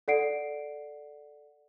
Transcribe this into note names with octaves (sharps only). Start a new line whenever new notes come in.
A4 D5 F#5 C7 D7